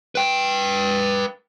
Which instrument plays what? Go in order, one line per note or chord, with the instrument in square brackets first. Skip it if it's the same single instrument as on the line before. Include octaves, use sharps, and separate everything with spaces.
[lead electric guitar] B4 G5